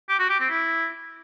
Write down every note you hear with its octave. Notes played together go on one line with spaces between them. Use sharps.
G4
F#4
G4
C4
E4